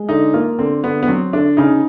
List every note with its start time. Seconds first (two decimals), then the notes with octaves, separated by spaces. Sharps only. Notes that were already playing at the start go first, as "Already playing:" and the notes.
Already playing: G#3
0.09 D3 D#4
0.34 A#3 F4
0.59 D3 C4
0.83 D3 B3
1.03 B3
1.08 F#3 C4
1.33 D3 D4
1.57 C#3 D#4